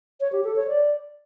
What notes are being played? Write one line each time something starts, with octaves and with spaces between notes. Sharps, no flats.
C#5
G4
A4
C#5
D5